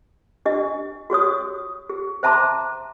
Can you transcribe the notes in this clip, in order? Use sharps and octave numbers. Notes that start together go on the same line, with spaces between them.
D4 G4 D#5
F#4 G4 C#5 D#6
G4
C5 E5 A5 A#5 C6 D6